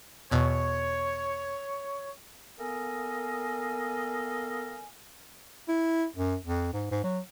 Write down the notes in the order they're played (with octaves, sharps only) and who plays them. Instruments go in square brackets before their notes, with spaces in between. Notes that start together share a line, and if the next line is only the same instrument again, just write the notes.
[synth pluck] E2 B2 [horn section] C#5
[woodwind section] A#3 B3 A4 D#5 F5 G#5
[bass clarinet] E4
F#2
F2
G#2
G#2
F#3